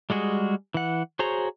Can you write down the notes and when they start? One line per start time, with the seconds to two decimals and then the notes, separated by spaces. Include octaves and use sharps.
0.10 G3 G#3 F#4 G#4
0.74 E3 F#5
1.19 F#4 G#4 C5 C#5 A#5